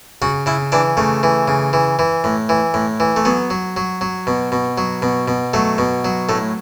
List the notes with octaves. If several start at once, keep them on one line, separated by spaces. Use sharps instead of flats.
C#3 F#4
C#3 E4
E3 D4
C#3 A3
E3
C#3
E3
E3
A2
E3
A2
E3
A3
F#3 B3
F#3
F#3
F#3
B2
B2
F#3
B2
B2
F#3 A3
B2
F#3
A2 A3